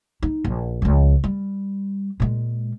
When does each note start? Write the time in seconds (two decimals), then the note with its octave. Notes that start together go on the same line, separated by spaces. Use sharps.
0.22 D#4
0.44 A#1
0.82 C#2 F3
1.24 G3
2.20 A#2 G#3